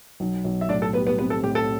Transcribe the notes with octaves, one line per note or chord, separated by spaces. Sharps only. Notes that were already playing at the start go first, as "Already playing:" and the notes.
B1
B1
E5
A2 D4 D5
A4
G3 B3 B4
B3 B4
B3 C4 B4
A4
A2 G4
A4